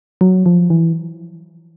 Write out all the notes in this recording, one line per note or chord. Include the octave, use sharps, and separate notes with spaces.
F#3
F3
E3